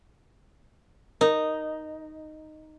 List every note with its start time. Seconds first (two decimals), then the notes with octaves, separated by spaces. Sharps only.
1.21 D#4 A#4